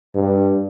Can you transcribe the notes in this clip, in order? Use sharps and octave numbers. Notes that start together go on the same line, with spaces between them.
G2